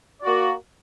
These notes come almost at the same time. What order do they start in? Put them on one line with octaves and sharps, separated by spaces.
D5 F#4 A#3